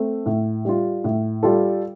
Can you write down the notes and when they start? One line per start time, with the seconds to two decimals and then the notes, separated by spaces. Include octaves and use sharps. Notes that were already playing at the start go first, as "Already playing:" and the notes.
Already playing: A3 C4
0.26 A2
0.65 G3 F4
1.04 A2
1.43 G3 F4 A4